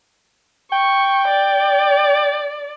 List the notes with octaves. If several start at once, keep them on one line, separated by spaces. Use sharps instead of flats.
G5 C#6
D5